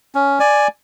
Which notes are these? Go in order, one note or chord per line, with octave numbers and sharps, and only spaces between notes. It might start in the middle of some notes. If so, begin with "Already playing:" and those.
C#4
D5 G#5